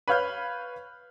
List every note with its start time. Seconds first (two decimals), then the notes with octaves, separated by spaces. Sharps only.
0.08 B4 C#5 F5 F6 G6